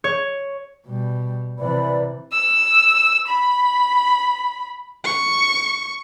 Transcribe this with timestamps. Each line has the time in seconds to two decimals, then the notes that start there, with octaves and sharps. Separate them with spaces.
0.04 C#5
0.86 B2 G3
1.59 C3 E3 B4 D5 B5
2.32 E6
3.28 B5
5.04 C#6